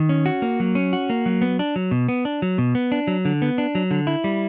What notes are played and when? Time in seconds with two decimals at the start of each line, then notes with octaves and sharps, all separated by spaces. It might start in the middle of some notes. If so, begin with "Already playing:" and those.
Already playing: D#3
0.09 C#4
0.26 F#4
0.42 A#3
0.60 F#3
0.75 C#4
0.93 F#4
1.10 A#3
1.26 F#3
1.42 B3
1.59 D4
1.76 F#3
1.91 B2
2.08 B3
2.25 D4
2.42 F#3
2.58 B2
2.75 B3
2.92 D4
3.07 F#3
3.25 D3
3.42 B3
3.58 D4
3.75 F#3
3.91 D3
4.07 E4
4.24 G3